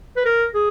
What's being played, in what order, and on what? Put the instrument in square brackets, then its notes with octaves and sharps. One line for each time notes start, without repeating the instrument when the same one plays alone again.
[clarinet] B4
A#4
G#4